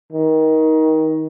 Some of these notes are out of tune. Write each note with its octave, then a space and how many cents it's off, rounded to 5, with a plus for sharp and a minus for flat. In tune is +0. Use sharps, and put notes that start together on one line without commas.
D#3 +20